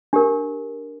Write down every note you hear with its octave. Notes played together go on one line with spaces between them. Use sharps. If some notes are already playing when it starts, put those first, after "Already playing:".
D4 G4 A#4